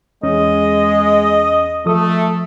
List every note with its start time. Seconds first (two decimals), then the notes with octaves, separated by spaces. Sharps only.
0.23 E2 G#3 C#4 D#5
1.86 F3 A3 A4 D#6